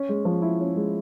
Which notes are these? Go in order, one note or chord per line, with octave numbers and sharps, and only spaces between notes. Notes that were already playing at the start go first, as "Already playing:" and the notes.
Already playing: C#4
G#3
F3
E4
C#4
G#3